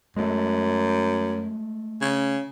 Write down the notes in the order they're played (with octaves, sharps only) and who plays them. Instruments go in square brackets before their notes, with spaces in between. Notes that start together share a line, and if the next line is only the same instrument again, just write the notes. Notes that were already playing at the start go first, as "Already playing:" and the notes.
[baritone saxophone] F#2 [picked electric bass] G#3 A3
[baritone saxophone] C#3